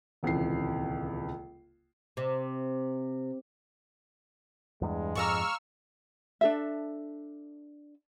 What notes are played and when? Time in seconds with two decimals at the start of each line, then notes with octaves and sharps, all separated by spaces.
0.23 D#1 C#2 C3 E3 C7
2.17 C3
4.82 E2 G2 G#3
5.15 F2 G#2 D5 F5 A#5 C#6 E6 F6
6.41 D4 A4 E5